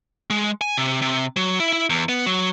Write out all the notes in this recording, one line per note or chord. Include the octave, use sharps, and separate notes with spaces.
G#3
G#5
C3
C3
F#3
E4
E4
E2
B3
F#3